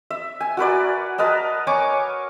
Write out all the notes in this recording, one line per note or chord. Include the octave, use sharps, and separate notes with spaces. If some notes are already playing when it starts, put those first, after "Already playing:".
E5
G#5
F#4 A#4 B4 D5
A#4 B4 D#5 A5
C#5 G#5 C#6 D6